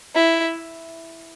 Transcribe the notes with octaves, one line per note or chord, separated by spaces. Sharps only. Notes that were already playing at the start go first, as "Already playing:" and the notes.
E4